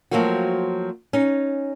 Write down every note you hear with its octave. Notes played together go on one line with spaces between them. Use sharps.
F3 F#3 A3 A#3 C4 F#4
C#4 D#4